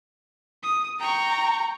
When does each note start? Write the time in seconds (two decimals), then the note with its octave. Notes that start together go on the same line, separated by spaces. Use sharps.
0.63 D#6
1.00 G5 A#5 C#6